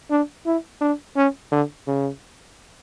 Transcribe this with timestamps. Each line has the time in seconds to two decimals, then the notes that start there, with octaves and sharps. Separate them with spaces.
0.11 D4
0.46 E4
0.81 D4
1.16 C#4
1.52 D3
1.87 C#3